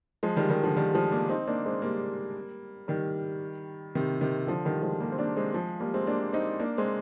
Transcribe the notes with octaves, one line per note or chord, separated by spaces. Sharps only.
F3 G#3
D#3 G3
D#3 G3
D3 F3
D#3 G3
F3 G#3
A#3 D4
C4 D#4
A#3 D4
G#3 C4
G3 A#3
D#3 G3
C3 D#3
C3 D#3
D3 F3
D#3 G3
F3 G#3
G3 A#3
C4
A#3 D4
G#3 C4
F3 G#3
G3 A#3
G#3 C4
A#3 D4
C4 D#4
A#3 D4
G#3 C4